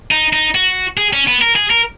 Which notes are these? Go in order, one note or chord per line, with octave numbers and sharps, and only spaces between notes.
D#4
D#4
F#4
G#4
C#4
B3
A#4
G#4
A#4